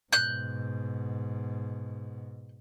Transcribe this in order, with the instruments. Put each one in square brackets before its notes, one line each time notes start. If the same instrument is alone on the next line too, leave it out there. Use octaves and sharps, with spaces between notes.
[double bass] G#2 B2 [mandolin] F#6 G6